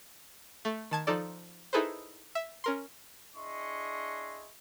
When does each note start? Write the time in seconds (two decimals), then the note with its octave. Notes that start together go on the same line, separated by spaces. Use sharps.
0.65 A3
0.91 D#3 A5 G#6
1.07 F3 D#4 A4 D5
1.73 D#4 E4 G#4 A4 B4 C5
2.35 E5
2.64 C#4 A#4 C6
3.35 D4 E4 G#4 D#5 C6 C#6